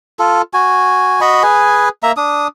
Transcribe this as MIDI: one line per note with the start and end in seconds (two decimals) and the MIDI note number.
0.19 0.42 65
0.19 0.42 69
0.54 1.21 66
0.54 1.21 80
1.21 1.43 66
1.21 1.43 75
1.21 1.43 83
1.21 1.43 85
1.43 1.89 68
1.43 1.89 71
1.43 1.89 80
2.03 2.12 58
2.03 2.12 76
2.03 2.12 82
2.17 2.47 62
2.17 2.47 87